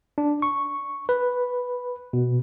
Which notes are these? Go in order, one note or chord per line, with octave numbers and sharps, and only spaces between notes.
D4
C#6
B4
B2